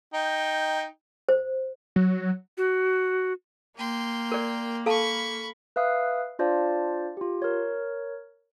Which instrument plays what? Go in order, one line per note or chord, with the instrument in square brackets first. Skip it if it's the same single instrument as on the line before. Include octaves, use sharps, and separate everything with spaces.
[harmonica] D#4 G5
[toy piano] C5
[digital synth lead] F#3
[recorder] F#4
[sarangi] A#3 [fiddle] G5 C6
[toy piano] A#4 D5
[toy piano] A4 F5 A5 [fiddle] B5 C#6
[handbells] B4 E5 F5 D#6 F#6
D4 F4 C5 D5 F5 A5
F4 G4
A#4 C#5